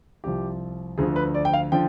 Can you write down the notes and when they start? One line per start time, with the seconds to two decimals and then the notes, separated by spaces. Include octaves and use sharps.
0.24 C2 C3 F3 G4
0.98 D2 D3 F3 G#4
1.16 B4
1.35 D5
1.45 G5
1.53 F5
1.72 D3 F3 G5